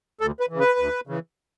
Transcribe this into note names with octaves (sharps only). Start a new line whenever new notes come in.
D2 A4
B4
C#3 E3
B4
D2
C#3 E3